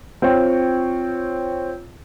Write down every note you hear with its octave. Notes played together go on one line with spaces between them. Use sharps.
C4 F4 C#5 G5